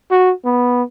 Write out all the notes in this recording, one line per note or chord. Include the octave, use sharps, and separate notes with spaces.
F#4
B3